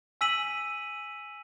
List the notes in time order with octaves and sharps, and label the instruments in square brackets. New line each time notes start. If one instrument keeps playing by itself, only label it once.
[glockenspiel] G#5 E6 B6 D#7 F#7